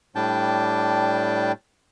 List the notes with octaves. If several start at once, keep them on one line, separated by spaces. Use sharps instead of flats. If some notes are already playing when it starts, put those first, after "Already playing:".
A2 G3 D4 G5 A5